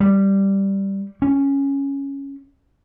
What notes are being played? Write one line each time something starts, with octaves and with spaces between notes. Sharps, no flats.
G3
C#4